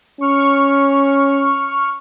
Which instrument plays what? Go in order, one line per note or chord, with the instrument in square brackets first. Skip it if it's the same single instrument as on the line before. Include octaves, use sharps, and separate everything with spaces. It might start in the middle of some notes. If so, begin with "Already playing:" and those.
[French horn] C#4 [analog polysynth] C#6 F6